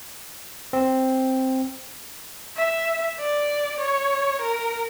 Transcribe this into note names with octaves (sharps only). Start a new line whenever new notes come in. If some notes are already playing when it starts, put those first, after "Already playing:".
C4
E5
D5
C#5
A#4